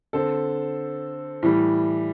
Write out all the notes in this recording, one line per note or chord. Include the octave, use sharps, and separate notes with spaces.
D3 C4 A4
A2 E3 G3